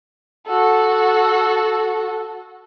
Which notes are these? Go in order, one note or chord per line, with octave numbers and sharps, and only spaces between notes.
F#4 A4